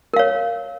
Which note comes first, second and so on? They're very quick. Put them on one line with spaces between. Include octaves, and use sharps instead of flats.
A#4 F5 C#5